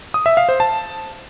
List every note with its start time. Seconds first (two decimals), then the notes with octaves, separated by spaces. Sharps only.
0.14 D#6
0.26 E5
0.37 F5
0.49 C5
0.60 A5